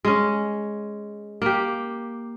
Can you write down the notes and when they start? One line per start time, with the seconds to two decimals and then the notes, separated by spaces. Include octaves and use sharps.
0.05 G#3 C#4
1.42 A#3 G4